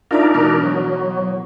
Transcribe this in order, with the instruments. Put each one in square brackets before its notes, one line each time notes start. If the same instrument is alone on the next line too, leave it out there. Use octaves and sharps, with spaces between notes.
[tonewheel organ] D4 D#4 A#4 [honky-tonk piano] F4 D5 E5
[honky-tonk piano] B2 E3 A#3
[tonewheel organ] F#3